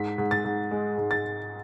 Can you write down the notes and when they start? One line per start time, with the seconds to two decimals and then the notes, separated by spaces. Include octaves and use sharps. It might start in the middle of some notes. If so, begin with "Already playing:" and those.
Already playing: G#2 B6
0.18 G#2
0.31 A6
0.45 G#2
0.71 G#3
0.97 G#2
1.11 A6